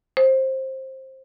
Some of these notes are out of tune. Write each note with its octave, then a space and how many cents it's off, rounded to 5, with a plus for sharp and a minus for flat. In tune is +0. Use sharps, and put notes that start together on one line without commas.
C5 +15